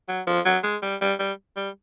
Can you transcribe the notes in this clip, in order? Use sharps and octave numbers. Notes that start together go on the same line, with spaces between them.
F#3
F3
F#3
G#3
G3
G3
G3
G3